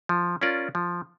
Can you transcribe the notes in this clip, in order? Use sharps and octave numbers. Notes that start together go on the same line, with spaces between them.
F3
C#4 F4 A#4 D5
F3